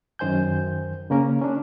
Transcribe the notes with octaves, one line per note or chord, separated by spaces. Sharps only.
F#2 D#3 C5 G#5 G6
C#3 A#3 C#4 A#4
C#4 D4